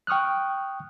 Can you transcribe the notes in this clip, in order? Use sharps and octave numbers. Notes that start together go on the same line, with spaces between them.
G5 C#6 D#6 F6 F#6